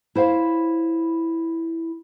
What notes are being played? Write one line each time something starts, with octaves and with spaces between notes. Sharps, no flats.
E4 C5 C#5 F5